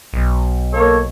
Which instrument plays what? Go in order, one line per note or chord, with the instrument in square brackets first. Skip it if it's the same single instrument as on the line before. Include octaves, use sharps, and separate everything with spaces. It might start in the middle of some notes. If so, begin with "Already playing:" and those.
[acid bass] B1
[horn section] A#3 A4 C#5